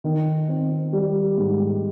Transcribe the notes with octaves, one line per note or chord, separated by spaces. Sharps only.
D#3
C4
G3
G#2